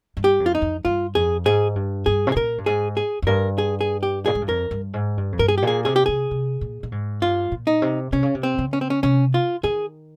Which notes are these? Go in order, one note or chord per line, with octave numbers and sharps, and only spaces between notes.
G2
G4
F2
F4
D#4
F2
G2 F4
F2 G#4
G#2 G#4
G2
G2 G#4
C3
G#4
A#2 A#4
G2
G#2 G#4
G#4
F2
G2 A#4
G#4
G#4
G4
A#2 G#4
G#2
G2
F2 A#4
G2
G#2
G2
F2
G2 A#4
G#4
G4
A#2 G#4
C3 G#4
G4
C3 G#4
C3
A#2
A#2
G#2
G2 F4
A#2
D#4
C3
C3 C#4
C#3
C3
C4
C#3
C#4
C4
C#4
C3 C#4
F4
D#3 G#4